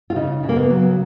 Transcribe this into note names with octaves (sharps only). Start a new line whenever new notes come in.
F4
C#3 D#4
C#3
A#3
B3
F#3